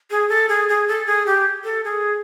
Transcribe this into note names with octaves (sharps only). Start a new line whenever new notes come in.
G#4
A4
G#4
G#4
A4
G#4
G4
A4
G#4